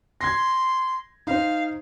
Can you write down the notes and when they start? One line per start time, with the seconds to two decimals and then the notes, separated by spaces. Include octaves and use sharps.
0.21 C6 G#6 A#6
1.27 D#4 C5 F5